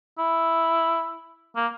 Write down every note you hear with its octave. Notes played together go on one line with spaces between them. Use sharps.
E4
A#3